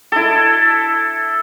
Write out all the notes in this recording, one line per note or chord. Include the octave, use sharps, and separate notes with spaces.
E4 A4